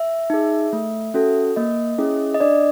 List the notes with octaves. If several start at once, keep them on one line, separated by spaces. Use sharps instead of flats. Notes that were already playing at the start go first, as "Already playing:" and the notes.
Already playing: E5
D#4 G#4
A3
C#4 F#4 A4
A#3 D#5
C#4 E4 G#4
D#5
D4 D5